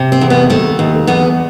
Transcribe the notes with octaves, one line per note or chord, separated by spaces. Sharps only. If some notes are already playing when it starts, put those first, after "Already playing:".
Already playing: C3
C4
E2
B3
D#2 A3
D#2
E2 B3